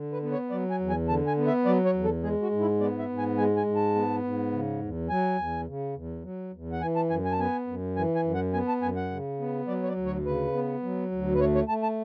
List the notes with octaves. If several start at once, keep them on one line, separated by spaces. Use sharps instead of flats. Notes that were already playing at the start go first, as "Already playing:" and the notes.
Already playing: D3
B4
B3
C#5
F#3 D5
G#5
E2
G#5
D3 A5
G#5
B3
E5
F#3 D5
C#5
E2
A4
G#3 G#4
F#4
G#2
E4
B3 D5
E5
G#2
G#5
G#3 G#5
G#5
G#2
A5
B3
G#2
C#3
E2
F#3 G#5
E2
C#3
E2
F#3
E2
F#5
E3 G#5
A5
F#2 G#5
G#5
A5
B3 G#5
F#2
E3 G#5
G#5
F#2
F#5
B3 G#5
A5
F#2 G#5
F#5
C#3
B3
F#3 D5
C#5
D5
D2
C#5
C#3 B4
B3
F#3
D2
B4
A3 C#5
C#5
A3 A5
A5